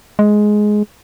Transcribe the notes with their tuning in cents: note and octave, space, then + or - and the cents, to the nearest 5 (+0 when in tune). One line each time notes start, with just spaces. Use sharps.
G#3 +10